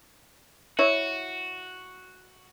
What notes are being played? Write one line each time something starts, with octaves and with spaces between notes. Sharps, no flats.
E4 F#4 C#5